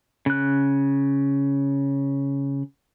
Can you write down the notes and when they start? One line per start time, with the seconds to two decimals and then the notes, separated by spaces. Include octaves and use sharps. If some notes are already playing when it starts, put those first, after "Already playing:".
0.26 C#3 F#6